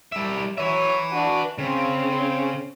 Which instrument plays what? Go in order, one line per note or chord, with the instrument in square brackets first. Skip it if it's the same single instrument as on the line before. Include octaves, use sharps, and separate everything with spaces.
[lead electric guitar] G3 E5
[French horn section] F#3 C#5 [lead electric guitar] B4 E5
[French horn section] D4 F#4
[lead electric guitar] C#3 [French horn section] C4